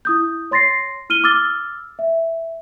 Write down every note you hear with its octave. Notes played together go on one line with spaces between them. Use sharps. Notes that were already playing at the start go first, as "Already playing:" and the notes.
E4 D#6 G6
C#5 C6 A6 A#6 C7
E4 F6 D#7 G7
D6 E6 F6 A6 G7
E5